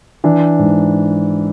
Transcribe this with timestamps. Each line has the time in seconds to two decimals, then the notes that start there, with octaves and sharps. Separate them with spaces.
0.24 E3 D4
0.59 G#2